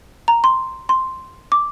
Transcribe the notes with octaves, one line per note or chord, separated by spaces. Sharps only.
A#5
C6
C6
D6